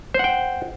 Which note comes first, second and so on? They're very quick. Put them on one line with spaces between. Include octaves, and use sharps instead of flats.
C5 F#5 G5